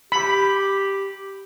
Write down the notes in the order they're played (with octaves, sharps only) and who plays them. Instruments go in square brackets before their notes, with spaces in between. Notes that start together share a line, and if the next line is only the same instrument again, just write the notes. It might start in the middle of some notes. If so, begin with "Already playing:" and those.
[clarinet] G4 [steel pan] B5